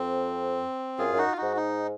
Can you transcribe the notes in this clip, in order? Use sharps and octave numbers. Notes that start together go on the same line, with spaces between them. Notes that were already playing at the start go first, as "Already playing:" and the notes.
Already playing: F2 C4
F#2 F4 G#4
F#2
D#4 F#4
F4
D#4 F#4
G#2
D#4